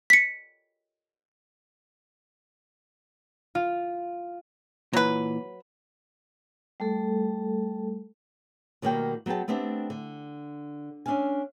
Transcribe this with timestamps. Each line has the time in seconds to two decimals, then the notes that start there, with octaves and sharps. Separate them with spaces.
0.10 B6 C#7
3.55 F4
4.93 A#2 E3 F#3 B4
6.80 G3 A3 A4
8.82 B2 D#3 G3 A#3 E5 G5
9.26 F#3 B3 G#4 G5 A5
9.48 A3 B3 C4 D4 G4
9.90 D3
11.06 C#4 D4 E5 F5 G#5